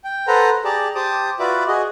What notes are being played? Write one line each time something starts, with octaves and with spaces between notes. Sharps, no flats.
G5
A4 B4 C5 F#5 A#5
G4 G#4 D5 A5 A#5
G4 C5 A5 D6 D#6
F4 F#4 B4 D5 E5 D6
F#4 G#4 D#5